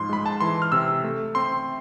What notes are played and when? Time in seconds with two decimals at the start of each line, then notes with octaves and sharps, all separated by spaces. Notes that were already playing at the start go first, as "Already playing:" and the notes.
Already playing: G#2 F3 C6
0.09 G#3 B5
0.26 A5
0.40 E3 C6
0.62 F6
0.72 C3 E6
1.04 A3
1.35 C4 C6